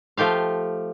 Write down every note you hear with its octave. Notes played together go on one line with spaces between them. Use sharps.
F3 A3 G4 F5